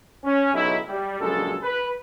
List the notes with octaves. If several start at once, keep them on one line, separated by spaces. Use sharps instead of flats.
C#4
B1 C#3 F#3 D#4 E4
G3
A#1 G2 C#3 F#3 G#3 A4
B4